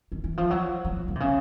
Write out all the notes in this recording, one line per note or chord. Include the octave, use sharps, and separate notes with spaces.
D#3
E3
F3
F#3
F3
E3
D#3
C3
C#3